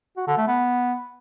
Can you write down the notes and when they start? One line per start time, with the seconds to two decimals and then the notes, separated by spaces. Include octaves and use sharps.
0.17 F#4
0.27 D3
0.37 A3
0.47 B3